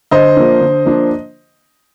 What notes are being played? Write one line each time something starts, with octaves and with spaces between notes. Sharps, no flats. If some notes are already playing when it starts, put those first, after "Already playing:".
D3 C5 D#5
F3 A#3 D4
D3
F3 A#3 D4